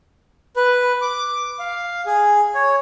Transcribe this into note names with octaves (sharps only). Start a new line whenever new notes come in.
B4
D6
F5
G#4
C#5